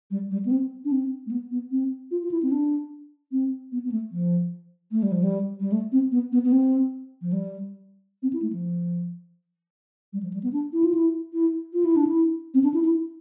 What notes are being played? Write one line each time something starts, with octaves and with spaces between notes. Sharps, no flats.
G3
G3
B3
C4
D4
C4
A3
B3
B3
C4
F4
F4
E4
C4
D4
C4
B3
B3
A3
F3
A3
G3
F3
G3
G3
A3
C4
B3
B3
B3
C4
F3
G3
C4
E4
A3
F3
G3
F3
G3
B3
D4
E4
F4
E4
E4
F4
E4
D4
E4
C4
D4
E4
E4